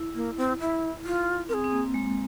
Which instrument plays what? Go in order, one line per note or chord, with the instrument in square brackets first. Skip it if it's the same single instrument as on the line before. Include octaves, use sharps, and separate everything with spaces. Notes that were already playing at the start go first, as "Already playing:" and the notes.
Already playing: [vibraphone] E4
[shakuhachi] A#3
C4
E4
F4
[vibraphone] C4 [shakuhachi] A#4
[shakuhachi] G#4
[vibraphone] C4
A#3
G#3